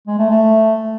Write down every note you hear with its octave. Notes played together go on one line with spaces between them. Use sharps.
G#3
A3
A3